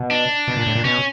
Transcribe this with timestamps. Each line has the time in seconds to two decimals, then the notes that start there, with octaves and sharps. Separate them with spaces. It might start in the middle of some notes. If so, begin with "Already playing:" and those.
Already playing: B2
0.11 D4
0.48 B2
0.57 A#2
0.67 A2
0.76 A#2
0.85 B2 C#4